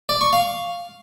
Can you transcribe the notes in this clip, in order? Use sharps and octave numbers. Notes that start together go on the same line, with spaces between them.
D5
C#6
F5